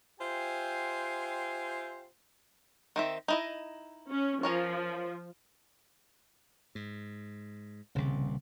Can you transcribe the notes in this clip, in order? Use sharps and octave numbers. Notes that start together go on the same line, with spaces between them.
F4 G4 C5 E5 G5 G#5
D#3 C4 E5
D#4 E4 D#5
C#4
F3 C#4 A#4 C#5
G#2
D#1 C2 C#3